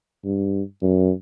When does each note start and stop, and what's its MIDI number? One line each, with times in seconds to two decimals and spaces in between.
0.25 0.62 43
0.82 1.11 42